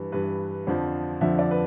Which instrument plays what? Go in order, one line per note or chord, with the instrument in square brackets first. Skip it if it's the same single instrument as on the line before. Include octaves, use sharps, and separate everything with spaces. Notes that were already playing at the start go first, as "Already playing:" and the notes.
Already playing: [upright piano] G2 E3
G2 E3 B4
F2 D3 F3 C5
F2 D3 F3 E5
D5
B4